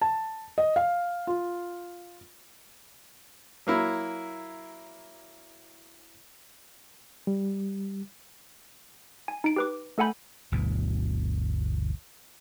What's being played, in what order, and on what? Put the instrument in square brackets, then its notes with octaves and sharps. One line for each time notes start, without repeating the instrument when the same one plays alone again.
[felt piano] A5
D#5
F5
F4
[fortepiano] F#3 A#3 E4
[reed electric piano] G3
[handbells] G#5
D#4 D7
G4 B4 D6
A3 A4 F#5 G#5 B5 G6
[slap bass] G1 D2 B2 E3